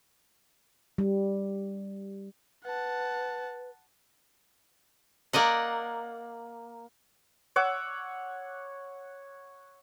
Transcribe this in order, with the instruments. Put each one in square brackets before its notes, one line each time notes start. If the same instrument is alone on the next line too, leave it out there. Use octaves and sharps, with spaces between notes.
[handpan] G3
[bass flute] B4 [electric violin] F#5 A5
[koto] A#3 D5 D#5 F#5
[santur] C#5 F#5 D6 E6